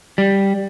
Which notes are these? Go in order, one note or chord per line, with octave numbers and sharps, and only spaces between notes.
G3